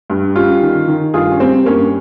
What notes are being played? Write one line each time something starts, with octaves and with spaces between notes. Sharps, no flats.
G2
G3 C#4 F4
D#3
D#3
G2 F4 G#4
C#4
G3 C4
G2 A#3 C#4